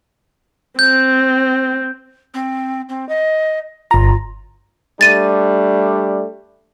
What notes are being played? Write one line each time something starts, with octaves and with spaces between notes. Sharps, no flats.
C4 G6
C4
C4
D#5
G1 F4 A#5
G3 A3 D4 A6 D#7